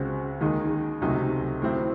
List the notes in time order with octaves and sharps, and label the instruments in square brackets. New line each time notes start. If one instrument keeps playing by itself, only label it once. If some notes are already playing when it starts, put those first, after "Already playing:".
Already playing: [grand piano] C#2 C#3 G#3 C4 F#4
D#2 D#3 G#3 D#4
C#2 C3 F#3 A3 D#4
A2 F#3 C4 E4